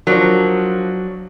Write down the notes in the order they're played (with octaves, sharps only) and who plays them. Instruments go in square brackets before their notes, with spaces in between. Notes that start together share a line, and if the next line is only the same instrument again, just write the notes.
[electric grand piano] F3 D4 A#4 [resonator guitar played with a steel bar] F#3